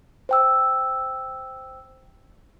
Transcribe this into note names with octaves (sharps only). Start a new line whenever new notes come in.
C5 G5 E6